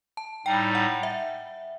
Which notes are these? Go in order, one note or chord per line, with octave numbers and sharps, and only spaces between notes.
A5
A2 G3 D#4 G5
F#5
E5